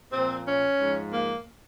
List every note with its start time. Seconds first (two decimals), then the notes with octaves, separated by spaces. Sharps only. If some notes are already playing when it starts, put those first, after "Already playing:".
0.12 A#2 F3 C4
0.45 C#4
0.78 G#2 F3
1.11 A#3